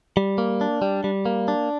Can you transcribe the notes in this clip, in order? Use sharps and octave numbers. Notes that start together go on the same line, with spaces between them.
G3
A#3
D4
G3
G3
A#3
D4